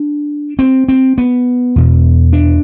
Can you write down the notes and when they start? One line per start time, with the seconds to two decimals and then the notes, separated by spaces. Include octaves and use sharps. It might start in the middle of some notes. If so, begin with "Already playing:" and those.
Already playing: D4
0.59 C4
0.89 C4
1.18 B3
1.76 E2 B2
2.33 D4